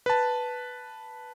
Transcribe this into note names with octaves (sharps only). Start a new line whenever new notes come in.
B4 A5